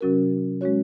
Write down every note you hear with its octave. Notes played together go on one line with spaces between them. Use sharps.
C3 F#3 C#4 F#4 A#4
G#3 C#4 F#4 C#5